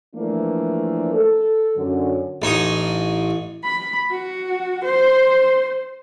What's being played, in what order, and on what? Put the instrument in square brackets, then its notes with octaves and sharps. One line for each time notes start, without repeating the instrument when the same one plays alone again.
[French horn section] E3 F3 A3 A#3 D4
A4
F#2 D3
[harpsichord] A1 D#4 C#5 D#6
[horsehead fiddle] B5
F#4
C5